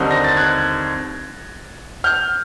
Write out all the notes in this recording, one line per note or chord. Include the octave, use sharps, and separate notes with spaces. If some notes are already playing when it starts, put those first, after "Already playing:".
Already playing: D#2 D3 G3 C4 D#4
A#6
A6
F#6 G#6
F6 G6